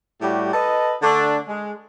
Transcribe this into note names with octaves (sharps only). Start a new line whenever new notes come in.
A2 G3 F#4 G4
A4 B4 D#5
D3 A3 D4
G#3